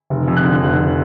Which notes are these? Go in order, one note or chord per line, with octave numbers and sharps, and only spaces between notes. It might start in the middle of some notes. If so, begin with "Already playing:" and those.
F1
F2
F#6
D3
F1